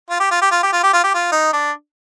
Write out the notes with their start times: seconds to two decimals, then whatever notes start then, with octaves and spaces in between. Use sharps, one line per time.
0.10 F4
0.20 G4
0.31 F4
0.42 G4
0.51 F4
0.63 G4
0.73 F4
0.83 G4
0.93 F4
1.04 G4
1.14 F4
1.32 D#4
1.53 D4